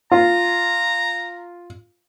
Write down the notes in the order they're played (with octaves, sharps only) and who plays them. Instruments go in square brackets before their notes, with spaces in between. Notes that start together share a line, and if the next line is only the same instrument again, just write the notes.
[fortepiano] F4 [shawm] A#5